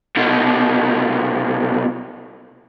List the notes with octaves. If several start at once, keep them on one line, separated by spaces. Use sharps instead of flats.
C2 B2